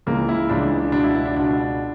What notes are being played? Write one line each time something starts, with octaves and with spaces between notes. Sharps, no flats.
C#2 C#3 E3 A#3
E4
C#2 C#3 E3 D4
D4
C#2 B2 D4
E4
E4
D4
C#2 B2 D4